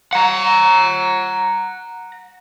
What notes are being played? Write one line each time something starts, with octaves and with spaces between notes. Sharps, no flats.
F#5 A#5